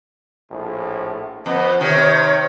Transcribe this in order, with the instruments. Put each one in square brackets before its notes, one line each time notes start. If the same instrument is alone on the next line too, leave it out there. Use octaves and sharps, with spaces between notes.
[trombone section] A#1 A2
[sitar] F2 [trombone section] B3 [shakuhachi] D#5
[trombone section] C3 [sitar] D#3 [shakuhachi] C#5